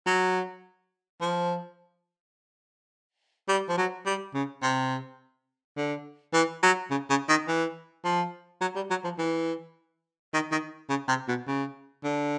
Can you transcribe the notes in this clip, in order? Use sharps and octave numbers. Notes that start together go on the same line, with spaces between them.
F#3
F3
G3
F3
F#3
G3
C#3
C3
D3
E3
F#3
C#3
C#3
D#3
E3
F3
F#3
G3
F#3
F3
E3
D#3
D#3
C#3
C3
B2
C#3
D3